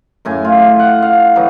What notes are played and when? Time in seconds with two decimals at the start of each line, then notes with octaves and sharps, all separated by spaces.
0.25 F#2 A2 G#5
0.45 F4
0.79 F#5
1.02 F5
1.36 E3 F#3 D#4